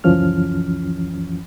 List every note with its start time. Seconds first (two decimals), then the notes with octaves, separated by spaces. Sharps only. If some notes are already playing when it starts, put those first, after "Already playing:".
0.04 C#2 F#2 E3 F3 C#4 F6